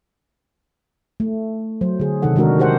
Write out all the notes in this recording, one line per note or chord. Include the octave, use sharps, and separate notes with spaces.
A3
F#3 C5
D3 G#4
C3 D#3 D#4 A4 F#5
D#3 G#3 D4 F#4 A#4
G4 G#4 C5 F#5